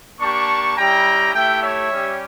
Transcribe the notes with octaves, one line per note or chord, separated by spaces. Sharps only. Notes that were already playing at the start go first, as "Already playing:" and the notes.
A#3 D4 G4 A5 C#6
G3 C#4 E4 G4 G5 A#5
A3 E4 G4 E5 G5
C#5 E5
G3 C#4 G4